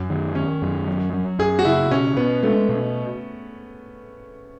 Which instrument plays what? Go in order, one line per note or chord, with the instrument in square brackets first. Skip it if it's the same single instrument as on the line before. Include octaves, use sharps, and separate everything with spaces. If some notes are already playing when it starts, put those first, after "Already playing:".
Already playing: [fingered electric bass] F#2
D#3
[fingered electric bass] D#3 [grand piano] C#4
[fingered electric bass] F#2
F#3
F#3
[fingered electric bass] F#2 [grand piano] G#4
[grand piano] F#4
[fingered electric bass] C#3 [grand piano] E4
[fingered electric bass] B2 [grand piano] C#4
[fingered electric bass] B2 [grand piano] B3
[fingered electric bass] G#3 [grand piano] A3
[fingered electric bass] B2